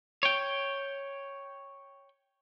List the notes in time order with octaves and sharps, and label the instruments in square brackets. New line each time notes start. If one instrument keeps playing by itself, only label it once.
[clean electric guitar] C#5 G5